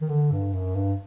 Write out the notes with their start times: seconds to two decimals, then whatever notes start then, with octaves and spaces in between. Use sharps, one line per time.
0.01 D#3
0.09 D3
0.32 G2
0.53 F#2
0.75 G2